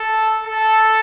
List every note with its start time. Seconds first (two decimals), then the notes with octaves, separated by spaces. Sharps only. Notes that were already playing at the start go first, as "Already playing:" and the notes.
Already playing: A4
0.45 A4